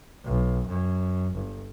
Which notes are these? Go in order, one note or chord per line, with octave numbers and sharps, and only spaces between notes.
B1
F#2
G1